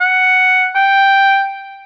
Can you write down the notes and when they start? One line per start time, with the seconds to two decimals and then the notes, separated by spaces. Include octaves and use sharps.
0.01 F#5
0.76 G5